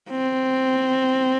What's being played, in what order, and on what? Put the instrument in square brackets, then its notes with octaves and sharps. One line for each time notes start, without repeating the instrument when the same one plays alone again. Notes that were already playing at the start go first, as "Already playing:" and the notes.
[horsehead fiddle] C4